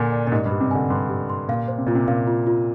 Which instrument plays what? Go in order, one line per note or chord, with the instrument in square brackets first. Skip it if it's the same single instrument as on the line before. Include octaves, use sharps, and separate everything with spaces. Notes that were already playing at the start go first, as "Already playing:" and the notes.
Already playing: [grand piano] A#2 D3 [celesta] A#4 G#5
[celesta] D5
[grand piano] A#2
[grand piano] G#2 [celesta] G4
[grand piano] G2
[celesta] G4
[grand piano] C3
[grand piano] D3 [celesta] G#5
[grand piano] G2 [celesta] C6
[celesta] G4
C6
[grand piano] A#2 [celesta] F5
[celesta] C5
[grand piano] C3
[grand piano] A#2 [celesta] F4
[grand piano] C3
[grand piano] A#2 [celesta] F5
[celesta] F4
F4